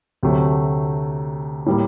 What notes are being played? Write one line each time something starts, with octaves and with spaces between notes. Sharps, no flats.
D2 C3 F#3 A3
A2 G3 A#3